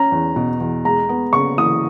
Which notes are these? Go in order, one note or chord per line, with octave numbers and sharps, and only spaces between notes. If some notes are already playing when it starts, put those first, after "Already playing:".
Already playing: C#4 A#5
E2
B2
E2
G#3 A#5
B3
C#3 C#6
E3 D#6